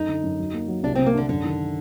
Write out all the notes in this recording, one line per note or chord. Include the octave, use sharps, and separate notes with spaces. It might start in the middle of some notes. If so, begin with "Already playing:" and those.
Already playing: F#2 D#4 A4
D3
F#2
F#3
A#3
F#3
C2 D4
C3 C4
A#3
D3 D4
F#2 D3
D#3